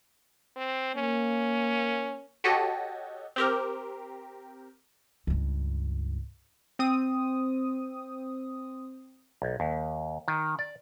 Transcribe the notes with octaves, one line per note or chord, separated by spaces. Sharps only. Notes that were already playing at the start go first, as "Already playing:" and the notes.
C4
A#3 C#4
F#4 G4 A4 C#5 D#5
C4 G4 A#4
C#2 G2
C4 D#6
B1
D#2
D#3
D5